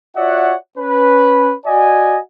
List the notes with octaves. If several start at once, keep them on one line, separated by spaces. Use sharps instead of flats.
F4 F#4 C#5 D5 E5 F#5
C#4 B4
F#4 D5 D#5 F#5 G#5